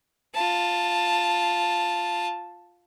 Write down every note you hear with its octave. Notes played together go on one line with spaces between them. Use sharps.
F4 A5